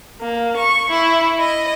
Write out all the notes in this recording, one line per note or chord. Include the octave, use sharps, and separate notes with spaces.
A#3
C#6
E4
D#5